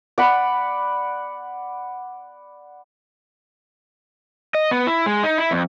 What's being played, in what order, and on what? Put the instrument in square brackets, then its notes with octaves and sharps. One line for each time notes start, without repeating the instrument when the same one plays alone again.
[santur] D5 F#5 B5
[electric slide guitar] D#5
B3
E4
G#3
D#4
E4
F2